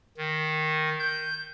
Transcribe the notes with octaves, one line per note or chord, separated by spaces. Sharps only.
D#3
G6